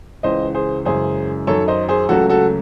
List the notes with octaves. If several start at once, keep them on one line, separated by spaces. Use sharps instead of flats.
C#2 C#3 E3 C5 D#5
G#4 C5
F#2 C#3 E3 G#3 G#4 C5
F#2 D#3 F#3 A4 C#5
C5 D#5
G#4 C5
C#2 C#3 F#3 A3 F#4 A4
F#4 A4